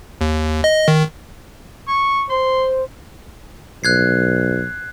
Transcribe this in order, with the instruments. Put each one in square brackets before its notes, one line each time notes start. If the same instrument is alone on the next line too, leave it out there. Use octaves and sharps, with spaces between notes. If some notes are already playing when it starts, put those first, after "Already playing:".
[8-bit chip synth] D#2
D#5
D#3
[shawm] C#6
[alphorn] C5 [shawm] C6
[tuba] B1 [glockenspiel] F#6 G#6 C7